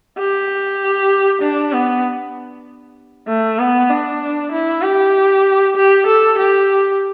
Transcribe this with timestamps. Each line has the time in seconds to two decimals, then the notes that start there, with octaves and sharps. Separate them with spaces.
0.19 G4
1.42 D4
1.73 B3
3.29 A3
3.59 B3
3.91 D4
4.52 E4
4.82 G4
5.76 G4
6.07 A4
6.38 G4